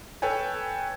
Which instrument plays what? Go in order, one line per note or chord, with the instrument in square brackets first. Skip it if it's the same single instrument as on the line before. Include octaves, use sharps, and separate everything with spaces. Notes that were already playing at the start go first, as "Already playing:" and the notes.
[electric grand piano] A4 B4 C#5 G5 G#5